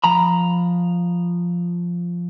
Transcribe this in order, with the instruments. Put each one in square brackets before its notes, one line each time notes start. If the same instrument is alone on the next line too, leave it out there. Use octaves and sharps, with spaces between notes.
[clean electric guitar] F3 A#5 B5